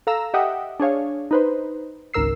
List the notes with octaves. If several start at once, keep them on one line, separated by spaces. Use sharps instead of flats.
A4 F5 A#5 E6
G4 D#5 E5 F#5 G5 D#6
D4 G#4 C#5 F5
D#4 B4 C5
G#1 C#2 G#2 A#4 E6 C7